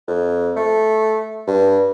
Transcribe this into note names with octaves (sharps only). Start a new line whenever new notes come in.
F2
A3
G2